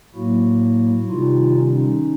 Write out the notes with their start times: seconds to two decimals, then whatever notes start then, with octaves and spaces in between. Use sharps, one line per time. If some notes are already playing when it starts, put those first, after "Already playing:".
0.15 A2 F#3 A#3 E4 F#4
1.10 C3 D#3 G3 D#4 F4
1.57 C#4 D#4